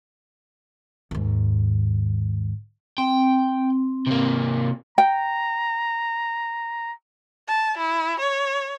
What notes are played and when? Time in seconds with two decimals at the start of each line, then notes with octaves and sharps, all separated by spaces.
1.11 D#2 G#2
2.98 C4 G5
4.07 C3 A#3
4.98 G5 A#5
7.48 A5
7.78 E4
8.20 C#5